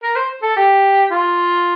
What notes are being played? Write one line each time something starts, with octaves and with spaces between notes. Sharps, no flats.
A#4
C5
A4
G4
F4